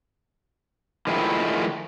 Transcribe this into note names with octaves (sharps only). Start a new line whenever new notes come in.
D#3 F3 G#3 A3 E4